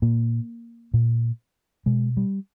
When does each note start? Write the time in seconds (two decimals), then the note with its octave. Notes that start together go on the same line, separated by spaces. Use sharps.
0.02 A#2 A#3
0.94 A#2
1.86 B2 G#3
2.17 G3